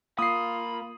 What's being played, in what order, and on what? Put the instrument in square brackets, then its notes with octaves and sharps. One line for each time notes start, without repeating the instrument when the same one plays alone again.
[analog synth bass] A#3 [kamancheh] F4 [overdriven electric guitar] B5 [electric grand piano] D#6 C7